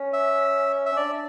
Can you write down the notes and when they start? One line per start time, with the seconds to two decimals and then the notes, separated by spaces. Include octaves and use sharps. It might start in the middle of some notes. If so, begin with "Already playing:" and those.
Already playing: C#4
0.13 E5
0.86 E5
0.92 C#4
0.96 D4 D5